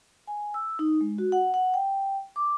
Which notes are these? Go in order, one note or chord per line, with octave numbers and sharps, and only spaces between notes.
G#5
E6
D#4
G#3
F#4
F#5
F#5
G5
D6